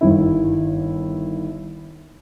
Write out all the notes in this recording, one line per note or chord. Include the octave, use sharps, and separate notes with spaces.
G1 D#3 E4